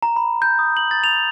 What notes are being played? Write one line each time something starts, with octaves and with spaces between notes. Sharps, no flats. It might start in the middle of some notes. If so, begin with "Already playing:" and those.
A#5
B5
G6
D#6
F#7
A6
F7